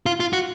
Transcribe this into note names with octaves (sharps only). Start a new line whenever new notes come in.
F4
F4
F#4